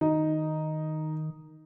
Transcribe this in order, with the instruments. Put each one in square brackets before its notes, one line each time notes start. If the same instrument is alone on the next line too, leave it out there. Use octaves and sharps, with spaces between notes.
[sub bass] D#3 [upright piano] D#4